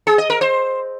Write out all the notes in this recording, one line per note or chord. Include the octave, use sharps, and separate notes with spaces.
G#4
D#5
A#4
C5